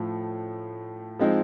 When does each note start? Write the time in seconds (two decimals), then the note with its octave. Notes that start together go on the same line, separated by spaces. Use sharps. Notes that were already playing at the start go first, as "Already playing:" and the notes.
Already playing: A2 F3 A3
1.19 F3 G#3 C4 D#4